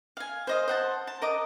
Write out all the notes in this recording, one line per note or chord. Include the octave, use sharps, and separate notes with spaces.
F5 G#5
C5 D#5 F5
C5 F#5 A5
A5
A#4 D#5 D6